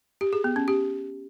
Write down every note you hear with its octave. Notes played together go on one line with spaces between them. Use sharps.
G4
G#4
B3
C#4
G4